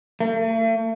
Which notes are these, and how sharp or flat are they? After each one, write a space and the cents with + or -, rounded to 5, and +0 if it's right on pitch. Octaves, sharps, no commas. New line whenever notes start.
A3 +40